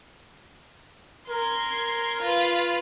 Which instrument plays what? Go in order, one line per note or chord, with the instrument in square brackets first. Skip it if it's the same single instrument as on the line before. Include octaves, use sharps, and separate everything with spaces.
[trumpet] A#4 [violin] C6 G#6
[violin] F4 B4